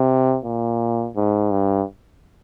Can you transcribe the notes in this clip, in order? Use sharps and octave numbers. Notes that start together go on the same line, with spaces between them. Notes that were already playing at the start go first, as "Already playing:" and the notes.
Already playing: C3
A#2
G#2
G2